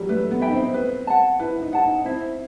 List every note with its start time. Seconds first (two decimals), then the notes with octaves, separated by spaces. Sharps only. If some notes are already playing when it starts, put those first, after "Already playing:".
Already playing: E3 F#3 G3
0.09 A3 B4
0.31 B3
0.41 E5 G5 B5
0.48 D#4
0.53 C4
0.74 B4
1.07 F#5 A5
1.39 E4 B4
1.62 D#4
1.73 F#5 A5
1.84 D#4
2.05 C4 E4